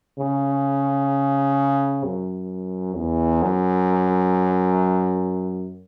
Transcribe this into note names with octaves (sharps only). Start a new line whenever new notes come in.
C#3
F#2
E2
F#2